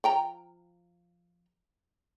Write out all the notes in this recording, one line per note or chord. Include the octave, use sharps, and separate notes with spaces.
F3 G5 A#5